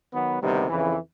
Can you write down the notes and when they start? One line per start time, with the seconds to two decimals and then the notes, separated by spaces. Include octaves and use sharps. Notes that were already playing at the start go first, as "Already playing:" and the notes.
0.12 D#3 F#3 B3
0.41 D2 C3 D#3 G3 B3
0.68 F2 C#3 E3